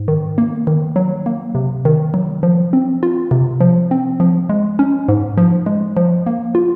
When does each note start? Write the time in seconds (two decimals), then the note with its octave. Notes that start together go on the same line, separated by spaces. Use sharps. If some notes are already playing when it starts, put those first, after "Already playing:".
Already playing: G#2
0.08 D#3
0.38 A#3
0.67 D#3
0.96 F#3
1.26 A#3
1.55 C3
1.85 D#3
2.14 F#3
2.43 F3
2.73 C4
3.03 F4
3.31 C3
3.61 F3
3.91 C4
4.20 F3
4.49 G#3
4.79 C#4
5.08 G#2
5.38 F3
5.66 G#3
5.97 F3
6.26 A#3
6.55 F4